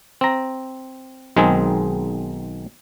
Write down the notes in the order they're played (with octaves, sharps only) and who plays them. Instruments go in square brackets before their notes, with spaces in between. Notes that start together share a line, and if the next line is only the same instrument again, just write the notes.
[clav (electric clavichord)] C4 A#5
B1 D#3 G#3 C4 G#4